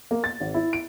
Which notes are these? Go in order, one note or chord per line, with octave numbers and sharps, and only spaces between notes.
A#3
A6
G#1
E4
D7